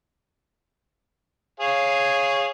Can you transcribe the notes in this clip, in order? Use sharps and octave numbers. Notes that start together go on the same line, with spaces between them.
G#4 C#5 F5